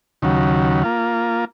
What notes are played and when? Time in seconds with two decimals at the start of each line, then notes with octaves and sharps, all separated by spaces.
0.22 D#2 C#3 F#3
0.84 A#3 F4